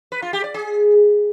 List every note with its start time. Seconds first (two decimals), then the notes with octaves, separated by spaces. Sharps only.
0.12 B4
0.22 F4
0.33 G4
0.44 D5
0.54 G#4